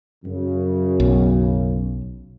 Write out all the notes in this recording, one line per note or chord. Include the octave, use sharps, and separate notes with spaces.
F#2 C#3
B1